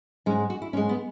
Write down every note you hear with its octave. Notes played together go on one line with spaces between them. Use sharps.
G#2 G#3 C#4
F#4
E4
G#2 G#3 C#4
B3